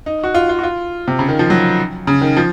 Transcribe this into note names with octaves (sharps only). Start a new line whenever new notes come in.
D#4
F#4
F4
F4
F#4
F4
C3
C#3
D#3
F3
F#3
C#3
D#3
F3